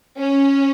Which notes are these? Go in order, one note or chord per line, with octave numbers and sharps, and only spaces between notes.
C#4